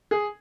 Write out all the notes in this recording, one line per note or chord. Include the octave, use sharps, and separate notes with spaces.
G#4